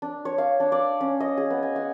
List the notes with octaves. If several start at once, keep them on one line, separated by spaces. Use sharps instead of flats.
D4
C#5
F5
D4
D5
C#4
D#5
G#4
B3
G#5
F#5